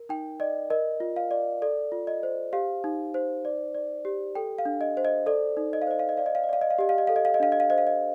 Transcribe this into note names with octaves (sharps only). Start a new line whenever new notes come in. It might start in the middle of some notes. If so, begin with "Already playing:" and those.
Already playing: A#4
D#4 G5
D5 D#5
A#4 D#5
F4
F5
D5
A4 D5
F4
D#5
C5
G4 F5
D#4
C5
D5
D5
G4
A4 G5
F5
D4
D#5
C5
D#5
A4 D5
D#4
D#5
F5
C5 D#5
F5
D#5
D5 F5
D#5
F5
D#5
D5 F5
D#5
F5
G4 D#5
F5
D#5
A4 F5
D#5
F5
D#5
D4 F5
D#5
F5
C5 D#5
F5
D#5